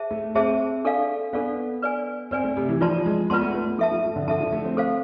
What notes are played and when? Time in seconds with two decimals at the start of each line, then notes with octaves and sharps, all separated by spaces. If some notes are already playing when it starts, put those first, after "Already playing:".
Already playing: G#4 C5 E5 A5
0.11 A3
0.35 C4 G#4 C5 E5 A5
0.85 D4 A4 D5 F5
1.33 B3 D4 A4 D5 F5
1.82 B4 D5 G#5
2.31 C4 B4 D5 G#5
2.44 A3
2.57 C3
2.69 E3
2.80 F3 F4 B4 D5 A5 C6
3.06 G#3
3.30 B3 F4 B4 D5 A5 C6
3.41 A3
3.54 B3
3.67 A3
3.78 F3 A4 E5 A5
3.92 F3
4.04 F3
4.16 D3
4.28 D3 A4 E5 A5
4.40 F3
4.52 A3
4.65 C4
4.77 A4 C5 F5